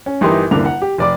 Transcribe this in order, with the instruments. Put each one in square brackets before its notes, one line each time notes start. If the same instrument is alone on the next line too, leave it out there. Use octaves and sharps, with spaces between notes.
[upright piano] C#4
G1 E3 D#4 G4 A#4 C6
D#1 C2 D3 A#3 D6 F7
F#5
G4
F1 D5 D6